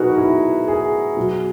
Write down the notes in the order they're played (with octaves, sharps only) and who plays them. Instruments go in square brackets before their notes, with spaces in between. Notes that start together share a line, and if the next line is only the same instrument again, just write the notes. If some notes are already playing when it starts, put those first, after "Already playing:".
Already playing: [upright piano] B2 F#3 D#4 F#4 G#4 A#4 B4
E4
G#4
B2 F#3